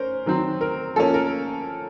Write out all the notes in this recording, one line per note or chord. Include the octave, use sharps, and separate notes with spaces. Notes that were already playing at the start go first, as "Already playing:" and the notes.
Already playing: C#4 A#4 C5
D#3 F#3 C4
A#4
F3 A#3 C#4 A4
A#4